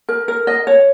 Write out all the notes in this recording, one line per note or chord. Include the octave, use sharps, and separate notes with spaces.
A#4
A#4
D#5
C#5